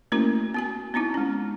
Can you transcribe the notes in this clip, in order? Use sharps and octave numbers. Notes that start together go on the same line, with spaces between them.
A3 A#3 C#4 E4 F#4 A#4
B3 F#4 G#5
B3 C4 D#4 E4
G#3 C#4